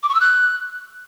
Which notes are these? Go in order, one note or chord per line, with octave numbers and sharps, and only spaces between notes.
D6
C#6
E6
F#6